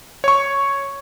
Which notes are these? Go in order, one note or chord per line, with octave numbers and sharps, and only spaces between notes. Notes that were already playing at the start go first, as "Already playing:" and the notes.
C#5 C#6